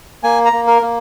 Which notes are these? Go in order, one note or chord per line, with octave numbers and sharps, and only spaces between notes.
A#3 G#5
A#5
A#3
A#4
A#3